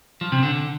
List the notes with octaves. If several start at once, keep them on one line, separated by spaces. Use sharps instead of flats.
F3
C3
D3